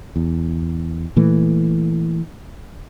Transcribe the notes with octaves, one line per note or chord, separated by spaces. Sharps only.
E2
A#2 E3 A3